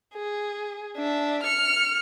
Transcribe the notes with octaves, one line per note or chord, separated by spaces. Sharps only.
G#4
D4 E5
F6 C#7